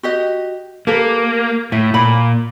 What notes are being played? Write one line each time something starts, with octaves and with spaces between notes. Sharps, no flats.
F#4 G4 D#5
A#3 G4 A4 B4
A2 E5
A#2 B5